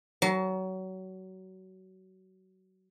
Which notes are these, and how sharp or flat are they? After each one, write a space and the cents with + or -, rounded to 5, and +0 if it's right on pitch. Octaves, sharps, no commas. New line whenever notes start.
F#3 +25 A5 -35